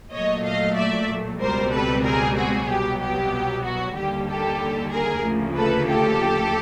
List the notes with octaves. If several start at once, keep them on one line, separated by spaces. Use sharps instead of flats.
A#2 F#3 A3 C#5 D#5
D#5 F5
D5 E5
C#2 B2 G3 C4 A#4 C5
A4 B4
G#4 A#4
F#4 G#4
C2 B2 F#3 B3 G4
G4
F#4
D#2 D3 G3 A#3 G4
G4 A4
G#4 A#4
D2 C#3 F3 A#3
A4 B4
G4 A4